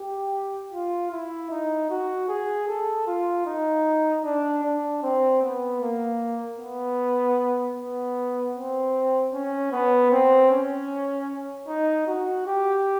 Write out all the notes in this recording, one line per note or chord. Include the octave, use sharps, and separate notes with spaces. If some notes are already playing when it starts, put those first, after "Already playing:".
Already playing: G4
F4
E4
D#4
F#4
G#4
A4
F4
D#4
D4
D4
C4
B3
A#3
B3
B3
C4
C#4
B3
C4
C#4
D#4
F#4
G4